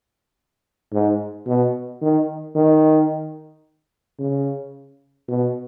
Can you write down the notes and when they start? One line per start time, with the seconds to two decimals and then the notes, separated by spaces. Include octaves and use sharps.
0.93 G#2
1.47 B2
2.02 D#3
2.55 D#3
4.19 C#3
5.28 B2